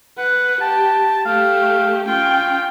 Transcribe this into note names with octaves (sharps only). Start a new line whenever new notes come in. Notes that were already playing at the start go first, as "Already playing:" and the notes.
B4 F#5
G4 A5
A3 G4 F5
C#4 F4 G5